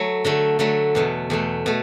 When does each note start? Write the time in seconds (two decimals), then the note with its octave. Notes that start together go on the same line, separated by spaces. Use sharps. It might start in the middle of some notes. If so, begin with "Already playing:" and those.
Already playing: F#3 A3
0.25 D3 F#3 A3
0.59 D3 F#3 A3
0.95 E2 B2 A3
1.30 E2 B2 A3
1.66 B2 A3